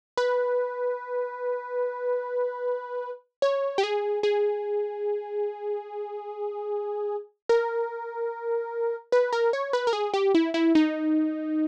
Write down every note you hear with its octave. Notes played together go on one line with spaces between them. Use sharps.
B4
C#5
G4
G#4
G#4
A#4
B4
A#4
C#5
B4
A#4
G#4
G4
E4
E4
D#4